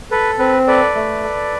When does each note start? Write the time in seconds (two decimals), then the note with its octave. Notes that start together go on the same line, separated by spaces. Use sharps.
0.11 A4 B4
0.39 C4 B4
0.67 A4 B4 D5
0.95 A3
1.24 A4